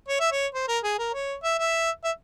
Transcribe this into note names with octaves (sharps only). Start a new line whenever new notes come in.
C#5
E5
C#5
C5
A#4
G#4
A#4
C#5
E5
E5
E5